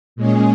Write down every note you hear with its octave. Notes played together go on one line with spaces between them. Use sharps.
A#2 G#3 C#4 G#4